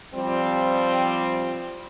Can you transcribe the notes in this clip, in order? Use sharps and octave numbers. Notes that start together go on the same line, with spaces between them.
F3 G3 C4